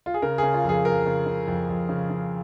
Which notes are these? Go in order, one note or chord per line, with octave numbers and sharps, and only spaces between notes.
F4
G#4
C#3 A#4
C#3 G#4
F4
F2 G#4
F2 A#4
C#3
C#3
F2
F2
C#3
C#3